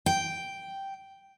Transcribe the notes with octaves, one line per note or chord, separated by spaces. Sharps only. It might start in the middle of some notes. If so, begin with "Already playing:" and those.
G5